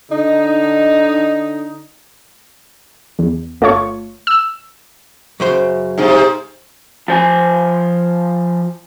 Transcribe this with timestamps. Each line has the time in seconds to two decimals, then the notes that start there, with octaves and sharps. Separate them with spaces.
0.12 D3 D#4
3.19 E2
3.61 G1 A3 F4 C#5 C#6
4.27 E6
5.40 F#2 C#3 C5
5.98 G#2 C3
7.08 F3 C5 G#5